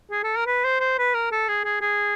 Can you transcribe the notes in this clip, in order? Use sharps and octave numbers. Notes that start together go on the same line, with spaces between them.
G#4
A4
A#4
B4
C5
C5
B4
A#4
A4
G#4
G#4
G#4